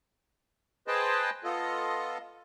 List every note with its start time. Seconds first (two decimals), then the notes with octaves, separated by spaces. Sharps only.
0.88 G#4 B4 C5 D#5 G5 A5
1.44 B3 F4 A4 D#5